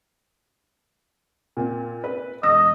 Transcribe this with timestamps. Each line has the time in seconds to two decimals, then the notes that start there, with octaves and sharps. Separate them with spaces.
1.57 A#2 C4
2.04 B4
2.43 E1 D#5 E6 A#6